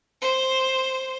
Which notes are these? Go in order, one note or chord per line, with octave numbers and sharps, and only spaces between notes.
C5